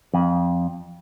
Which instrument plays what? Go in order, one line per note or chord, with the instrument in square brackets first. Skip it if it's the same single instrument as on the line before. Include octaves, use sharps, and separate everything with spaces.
[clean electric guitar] F2